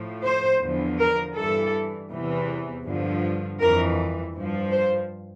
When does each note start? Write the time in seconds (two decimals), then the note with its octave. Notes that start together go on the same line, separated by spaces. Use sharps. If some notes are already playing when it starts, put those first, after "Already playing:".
Already playing: A2 F3
0.23 C5
0.60 E2 D3 F3
0.98 A#4
1.35 G2 E3 A4
2.10 E2 C3 E3
2.85 G2 D3 F3
3.59 F2 E3 A#4
4.34 G2 F3
4.72 C5